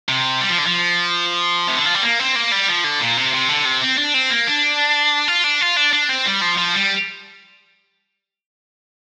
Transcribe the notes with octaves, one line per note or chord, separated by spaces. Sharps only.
C3
G3
F3
D3
F3
C3
D3
F3
G3
A#3
C4
A#3
G3
F3
D3
A#2
C3
C3
D3
C3
C4
D4
C4
A#3
D4
F4
D4
F4
D4
D4
C4
G3
F3
F3
G3